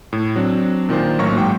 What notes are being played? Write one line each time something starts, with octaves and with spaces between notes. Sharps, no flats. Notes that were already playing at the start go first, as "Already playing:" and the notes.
A2
F#3 C4 D4
A#2 D#3 D4 C5
A1 F#3 A#3 C#4 F#4 C#6
G#2 F#3 G#3 G5 C#6 D6